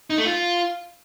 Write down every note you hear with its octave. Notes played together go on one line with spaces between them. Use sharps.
D#4
A3
F4